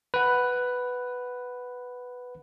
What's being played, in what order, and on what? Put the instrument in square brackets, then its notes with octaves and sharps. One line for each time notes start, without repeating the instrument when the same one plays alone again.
[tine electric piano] B4 F#5